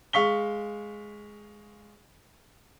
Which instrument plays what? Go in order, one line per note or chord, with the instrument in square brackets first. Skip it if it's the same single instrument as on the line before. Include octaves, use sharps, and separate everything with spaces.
[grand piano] G#3 F5 C#6 B6 G7